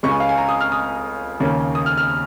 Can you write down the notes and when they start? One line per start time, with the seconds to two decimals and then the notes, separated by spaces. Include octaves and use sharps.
0.03 C#2 C#3 G#3 C#6
0.11 G#5
0.20 F5
0.29 G#5
0.37 A#5
0.49 D#6
0.60 F6
0.72 D#6
1.40 D#2 C#3 A#3 C#4
1.75 D#6
1.86 F6
1.97 F6